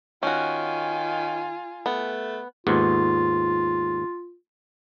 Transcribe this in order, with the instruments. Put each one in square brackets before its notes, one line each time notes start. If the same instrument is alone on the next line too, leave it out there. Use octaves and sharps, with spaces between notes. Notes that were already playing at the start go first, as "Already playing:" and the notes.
[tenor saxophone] D#3 [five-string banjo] C#4 F#4 [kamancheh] F4 G#5
[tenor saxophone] A3 [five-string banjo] B3
[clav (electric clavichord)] D#2 G#2 B3 [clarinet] F4